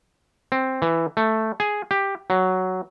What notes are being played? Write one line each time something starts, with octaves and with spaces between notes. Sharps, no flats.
C4
E3
A3
G#4
G4
F#3